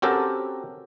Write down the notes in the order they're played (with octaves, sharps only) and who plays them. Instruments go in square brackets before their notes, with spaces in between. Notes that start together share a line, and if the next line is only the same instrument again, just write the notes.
[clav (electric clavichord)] C4 C#4 F#4 G4 A4 A#4